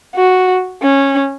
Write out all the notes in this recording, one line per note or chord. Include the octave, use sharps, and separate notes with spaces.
F#4
C#4